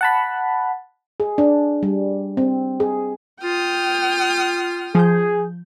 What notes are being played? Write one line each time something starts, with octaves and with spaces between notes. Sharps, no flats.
F#5 A5 B5
G#4
D4
G3
C4
G#4
F4 G5 D#6 F6
F3 G#4 G6